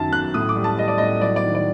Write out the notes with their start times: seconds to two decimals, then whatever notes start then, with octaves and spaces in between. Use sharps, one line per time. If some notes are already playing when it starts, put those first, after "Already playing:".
Already playing: F#2 D#3 F#3 A5
0.12 F#2 F#6
0.34 A2 D#6
0.49 D6
0.56 G3
0.64 A5
0.78 G3 D#5
0.88 D5
0.98 A2 D#5
1.21 F#3 D5
1.36 D5
1.44 D#3
1.55 D5